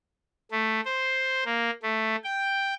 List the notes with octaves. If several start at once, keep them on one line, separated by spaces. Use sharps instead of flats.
A3
C5
A#3
A3
G5